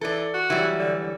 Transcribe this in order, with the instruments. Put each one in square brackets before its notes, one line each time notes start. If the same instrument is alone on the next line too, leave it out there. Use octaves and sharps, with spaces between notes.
[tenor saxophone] E3 [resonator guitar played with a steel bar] A4 D5
[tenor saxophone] F#4
[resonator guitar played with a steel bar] E3 F#3 G3
[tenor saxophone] D3
D3